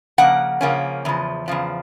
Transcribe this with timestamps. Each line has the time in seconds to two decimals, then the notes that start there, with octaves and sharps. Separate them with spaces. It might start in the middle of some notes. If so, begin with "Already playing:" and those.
0.18 C#3 F3 A#3 F#5
0.61 C#3 F3 A#3 C#4
1.05 E2 C#3 F3
1.48 E2 C#3 F3